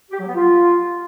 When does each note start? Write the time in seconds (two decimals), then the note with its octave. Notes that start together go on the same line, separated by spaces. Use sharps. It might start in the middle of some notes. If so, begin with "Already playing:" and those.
0.11 G4
0.19 F#3
0.27 B3
0.35 F4